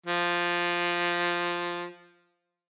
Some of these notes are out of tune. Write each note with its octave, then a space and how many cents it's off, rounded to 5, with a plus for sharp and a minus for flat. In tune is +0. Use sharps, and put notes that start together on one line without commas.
F3 +0